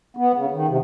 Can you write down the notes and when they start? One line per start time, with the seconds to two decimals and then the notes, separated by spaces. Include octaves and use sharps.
0.17 B3
0.35 C#3
0.51 D#3
0.68 C3